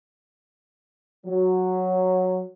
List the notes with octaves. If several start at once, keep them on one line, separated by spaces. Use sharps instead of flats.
F#3